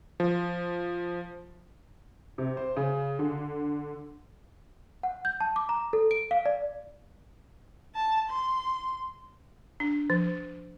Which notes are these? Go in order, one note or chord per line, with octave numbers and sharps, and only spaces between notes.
F3
C3
C5
C#3
D3
F#5
G6
A5
D6
A#5
A4
D7
F5
D5
A5
C6
D4
F3